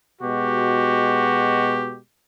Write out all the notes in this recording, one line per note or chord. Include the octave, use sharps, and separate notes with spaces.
B2 G#3 F#4 G4